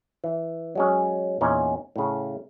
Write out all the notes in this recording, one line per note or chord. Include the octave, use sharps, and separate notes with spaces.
E3
F#3 G#3 C#4
E2 A#2 C#4 D#4
A2 C#3